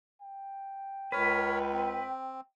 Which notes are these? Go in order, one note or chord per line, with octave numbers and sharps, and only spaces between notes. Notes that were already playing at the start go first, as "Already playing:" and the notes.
G5
C#2 A#4 B4 C#5
C4